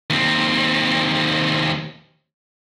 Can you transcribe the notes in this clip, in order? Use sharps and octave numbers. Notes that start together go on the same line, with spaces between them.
D#2 C4